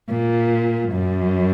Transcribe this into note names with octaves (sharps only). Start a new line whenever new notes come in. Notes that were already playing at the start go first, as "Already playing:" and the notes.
A#2
F#2